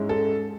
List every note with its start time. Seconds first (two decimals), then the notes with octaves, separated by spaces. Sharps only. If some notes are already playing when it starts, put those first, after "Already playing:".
Already playing: G#2 G#3 C#4 E4
0.09 A4